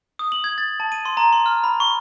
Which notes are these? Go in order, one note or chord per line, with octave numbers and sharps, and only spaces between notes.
D#6
F#7
G#6
A6
A5
D#7
C6
A#5
C6
F6
B5
C#6